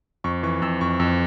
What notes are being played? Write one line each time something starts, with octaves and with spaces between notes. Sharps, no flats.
F2 C#6
E3 C#6
F2 E6
F2 C#6
F2 E6